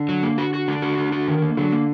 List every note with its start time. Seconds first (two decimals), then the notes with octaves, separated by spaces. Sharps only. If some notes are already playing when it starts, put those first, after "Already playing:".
Already playing: D3
0.09 F#3
0.23 A#3
0.38 F#4
0.54 F#4
0.68 D3 D4
0.82 F#4
0.98 D4
1.12 F#4
1.28 D#3
1.42 A#3
1.57 D3 F#3
1.72 A#3